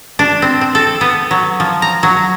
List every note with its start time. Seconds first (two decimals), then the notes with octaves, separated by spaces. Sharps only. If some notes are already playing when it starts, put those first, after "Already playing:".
0.19 D4
0.42 C4
0.61 C4
0.75 A4
1.01 B3
1.31 F#3
1.60 F3
1.82 A#5
2.03 F#3